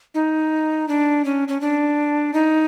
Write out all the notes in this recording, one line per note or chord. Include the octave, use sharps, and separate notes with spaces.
D#4
D4
C#4
C#4
D4
D#4